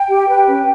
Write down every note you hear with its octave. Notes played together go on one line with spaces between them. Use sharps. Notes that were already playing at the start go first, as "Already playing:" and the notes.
Already playing: G5
G4
B4
C#4